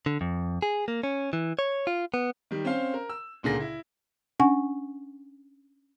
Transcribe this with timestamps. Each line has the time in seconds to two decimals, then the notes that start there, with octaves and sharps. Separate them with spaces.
0.06 D3
0.21 F2
0.62 G#4
0.88 A#3
1.03 C#4
1.33 E3
1.59 C#5
1.87 F4
2.14 B3
2.51 D#3 G3
2.65 C4 C#4 C5 F5
2.94 A#4
3.09 E6
3.43 C#2 A#2 D3 G#4 A#4 A#6
3.60 E4
4.40 C#4 D4 F#5 G#5 C#6